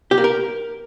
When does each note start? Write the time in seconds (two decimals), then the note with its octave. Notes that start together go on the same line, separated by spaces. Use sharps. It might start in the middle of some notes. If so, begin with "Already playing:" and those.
0.11 G4
0.18 A#3
0.24 A#4